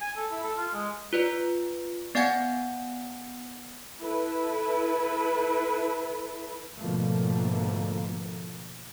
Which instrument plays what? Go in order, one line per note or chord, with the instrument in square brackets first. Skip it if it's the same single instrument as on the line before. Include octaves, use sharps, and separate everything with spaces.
[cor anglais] G#5
A4
E4
A4
F4
G#3
[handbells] F4 B4 D5
B3 D5 F5 F#5 G#5 G#6
[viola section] E4 A4 B4
[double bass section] G#2 B2 D3 F3 A3 A#3